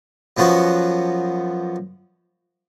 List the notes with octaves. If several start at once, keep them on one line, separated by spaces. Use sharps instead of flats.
F#2 F3 B3 F#4 A5